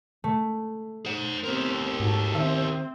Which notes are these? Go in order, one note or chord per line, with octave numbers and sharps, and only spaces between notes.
A3
C5 F#5
B3 C4 G4 A#4
G#2 F#4 A4
D#3 C4 E5